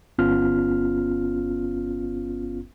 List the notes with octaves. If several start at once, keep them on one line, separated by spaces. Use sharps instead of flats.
G1 B3 C#4 F4 F6